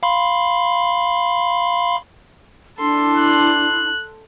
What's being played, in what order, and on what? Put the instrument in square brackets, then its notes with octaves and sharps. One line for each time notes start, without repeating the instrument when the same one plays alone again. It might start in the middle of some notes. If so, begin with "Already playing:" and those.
[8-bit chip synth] F5 B5 C6
[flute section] D4 E4 [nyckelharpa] A4 C6
[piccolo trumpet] F#6